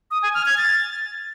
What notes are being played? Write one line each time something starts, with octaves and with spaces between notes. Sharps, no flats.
D#6
G#5
F6
G#6
A6